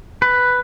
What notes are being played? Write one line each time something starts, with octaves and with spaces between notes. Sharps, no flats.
B4